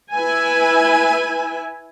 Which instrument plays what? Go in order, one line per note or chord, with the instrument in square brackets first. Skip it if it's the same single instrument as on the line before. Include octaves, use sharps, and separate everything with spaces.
[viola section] E4 B4 E5 G#5